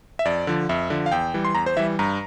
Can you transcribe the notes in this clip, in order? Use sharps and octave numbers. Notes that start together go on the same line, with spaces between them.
E5
F2 D5
D3 F3
F2 E5
D3 F3
F5
E2 G5
E3 G3
C6
E2 A#5
C5
E3 G3 E5
G2 A#5